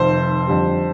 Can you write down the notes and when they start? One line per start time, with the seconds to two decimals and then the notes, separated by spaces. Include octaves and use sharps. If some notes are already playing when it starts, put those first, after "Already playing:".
Already playing: F1 F2 D#3 C5
0.47 F2 D3 G3